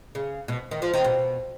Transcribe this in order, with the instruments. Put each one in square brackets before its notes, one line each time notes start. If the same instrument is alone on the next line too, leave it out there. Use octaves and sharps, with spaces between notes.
[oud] C#3
B2
D#3
F3
D#3
B2